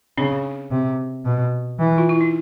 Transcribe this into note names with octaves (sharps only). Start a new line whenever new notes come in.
C#3 C4 D4
C3
B2
E3
F4
E4
D#4